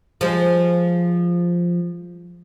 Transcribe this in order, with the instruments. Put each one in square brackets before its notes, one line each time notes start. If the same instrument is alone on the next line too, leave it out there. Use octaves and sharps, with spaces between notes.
[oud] F3 G#3